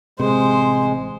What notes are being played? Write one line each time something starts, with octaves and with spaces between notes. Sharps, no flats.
A1 C3 G#3 C5